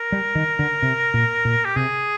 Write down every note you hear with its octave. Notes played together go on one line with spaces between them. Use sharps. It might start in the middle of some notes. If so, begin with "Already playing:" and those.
Already playing: A#4
G3
D#3
D3
C3
A#2
A#2
G4
C3 G#4